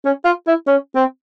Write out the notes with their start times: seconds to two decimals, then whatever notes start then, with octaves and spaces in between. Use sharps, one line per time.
0.05 C#4
0.25 F4
0.47 E4
0.67 C#4
0.95 C4